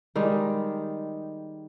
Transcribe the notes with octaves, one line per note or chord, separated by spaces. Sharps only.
D#3 G3 G#3 D#4